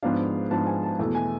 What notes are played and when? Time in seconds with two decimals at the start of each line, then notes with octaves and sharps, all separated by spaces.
0.03 G#2 F3 B3 D4 F5
0.51 G#2 F3 B3 D4 A5
0.67 G#5
0.83 A5
0.99 E2 B2 A3 E4
1.15 G#5